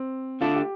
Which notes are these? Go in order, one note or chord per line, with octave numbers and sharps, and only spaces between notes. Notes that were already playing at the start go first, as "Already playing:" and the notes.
Already playing: C4
D3 A3 D4 F4 A4
G4